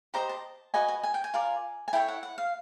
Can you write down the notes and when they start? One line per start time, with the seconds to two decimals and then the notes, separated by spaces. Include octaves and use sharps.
0.14 G4 C5 D#5 A#5
0.29 A5
0.74 F#4 B4 D#5 G#5
0.88 G#5
1.03 G#5
1.14 G5
1.24 G#5
1.34 F4 A#4 D5
1.88 G#5
1.93 E4 A4 C#5 G5
2.08 F#5
2.23 F#5
2.38 F5